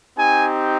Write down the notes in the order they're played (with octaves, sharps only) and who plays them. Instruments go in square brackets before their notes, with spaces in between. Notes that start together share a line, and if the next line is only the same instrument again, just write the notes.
[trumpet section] C4 D#4 G4 G#5